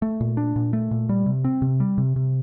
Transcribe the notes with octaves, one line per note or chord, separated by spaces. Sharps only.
A3
A#2
D4
A#2
A3
A#2
G3
C3
C4
C3
G3
C3
C3